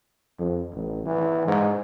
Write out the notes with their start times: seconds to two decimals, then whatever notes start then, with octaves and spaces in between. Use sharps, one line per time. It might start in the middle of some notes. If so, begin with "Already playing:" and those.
0.39 F2
0.74 A1
1.06 E3
1.47 G#2